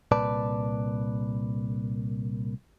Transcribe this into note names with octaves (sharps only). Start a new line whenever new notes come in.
C2 A#2 B4 D5 A5